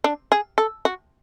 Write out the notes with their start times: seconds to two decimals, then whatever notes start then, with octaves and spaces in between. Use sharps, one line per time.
0.04 D4
0.32 G#4
0.58 A4
0.85 F#4